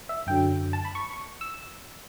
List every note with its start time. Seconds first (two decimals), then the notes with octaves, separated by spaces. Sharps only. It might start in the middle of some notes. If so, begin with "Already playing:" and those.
0.09 E5
0.26 F#2 D3 F#3 G5
0.73 A5
0.85 B5
0.95 C#6
1.13 C#6
1.41 E6